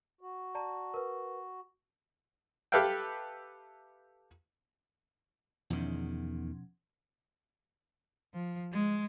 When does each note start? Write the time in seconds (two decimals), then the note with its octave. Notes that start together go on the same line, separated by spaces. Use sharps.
0.21 F#4
0.55 D5 A5 A#5
0.94 A#4 B4
2.72 G4 A4 B4 E5 F5 G5
5.70 E2 B2 D#3 F3 C#4
8.34 F3
8.73 G#3